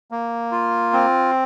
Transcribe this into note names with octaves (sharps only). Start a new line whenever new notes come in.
A#3
F4
C4